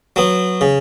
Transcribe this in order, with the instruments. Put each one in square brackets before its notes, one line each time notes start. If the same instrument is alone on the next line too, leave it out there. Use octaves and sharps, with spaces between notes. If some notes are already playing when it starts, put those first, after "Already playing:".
[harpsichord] F#3 B3
C#3